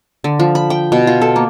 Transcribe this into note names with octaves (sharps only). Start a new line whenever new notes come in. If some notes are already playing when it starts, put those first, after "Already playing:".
D3
F3
B5
G5
B2
F4
A4
A#3